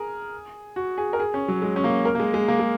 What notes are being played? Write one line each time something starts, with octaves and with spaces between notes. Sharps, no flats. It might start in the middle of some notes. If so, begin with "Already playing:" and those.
Already playing: G#4 A#4
F#4
G#4
A#4
G#4
C#4
F#3
G#3
C#4
A#3
A#4
A#3
G#3
G#3
A#3
G#3